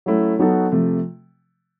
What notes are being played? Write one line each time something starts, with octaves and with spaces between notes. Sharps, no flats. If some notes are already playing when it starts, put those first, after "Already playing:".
F#3 A3 C#4 E4
F#3 B3 D#4 F#4 A4
C3 F3 A3